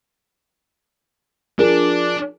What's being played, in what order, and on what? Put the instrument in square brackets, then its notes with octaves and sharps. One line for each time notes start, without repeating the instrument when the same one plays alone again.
[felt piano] F3 G#4 A#4 [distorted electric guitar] D4